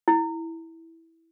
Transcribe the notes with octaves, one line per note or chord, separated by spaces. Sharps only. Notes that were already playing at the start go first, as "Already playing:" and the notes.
E4